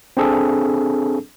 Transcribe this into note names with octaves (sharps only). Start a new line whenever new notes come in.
C4 D4 G#4 A4